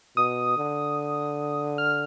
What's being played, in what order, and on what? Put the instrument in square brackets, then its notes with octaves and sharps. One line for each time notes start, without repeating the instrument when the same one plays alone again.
[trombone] B2 [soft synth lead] D#6
[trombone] D3
[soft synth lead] F6